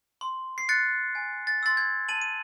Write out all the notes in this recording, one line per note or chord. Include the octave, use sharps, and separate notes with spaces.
C6
C7
F#6 A6 C#7
G#5
A6
C6 E6 A6
G#6
A5 D#7 F#7
D#7